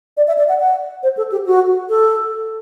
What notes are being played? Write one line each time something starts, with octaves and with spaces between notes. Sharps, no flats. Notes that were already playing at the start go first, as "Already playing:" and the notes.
D5
E5
D5
F#5
F#5
C5
A4
G4
F#4
A4